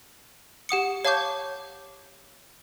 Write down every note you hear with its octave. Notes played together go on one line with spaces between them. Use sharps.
G4 F#5 D#6 C#7
C#5 F5 A5 C#6 D6 G6